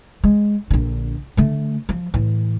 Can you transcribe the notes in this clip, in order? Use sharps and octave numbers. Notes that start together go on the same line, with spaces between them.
G#3
A#1 D3
D3 A3
F3
A2 E3